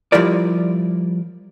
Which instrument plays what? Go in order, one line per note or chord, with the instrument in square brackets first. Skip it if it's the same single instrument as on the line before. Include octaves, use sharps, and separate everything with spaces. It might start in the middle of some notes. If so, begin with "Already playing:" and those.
[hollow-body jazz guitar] F3 G3 E4 F4 A#4 D5